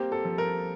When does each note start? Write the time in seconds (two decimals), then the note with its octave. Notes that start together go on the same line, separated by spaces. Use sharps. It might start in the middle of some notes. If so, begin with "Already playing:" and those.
Already playing: A#3 C4 G4
0.12 A4
0.25 F3
0.38 A#4